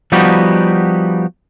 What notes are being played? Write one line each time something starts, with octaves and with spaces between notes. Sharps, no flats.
F3 G3 B3 D#4 F#4 G4